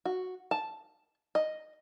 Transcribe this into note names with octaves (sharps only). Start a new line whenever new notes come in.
F#4
A5
D#5